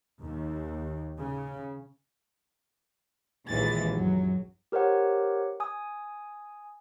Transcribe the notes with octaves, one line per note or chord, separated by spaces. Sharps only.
D#2
C#3
A#1 D#2 E3 G#3 A6
F#2 F#3
G4 A#4 C5 C#5 F#5
G#5 D#6